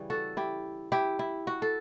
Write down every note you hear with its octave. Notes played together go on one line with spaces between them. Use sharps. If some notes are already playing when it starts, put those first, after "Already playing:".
Already playing: C#3 E3 G3 C#4
F#4 A4
E4 G4
E4 G4
E4
F#4
A4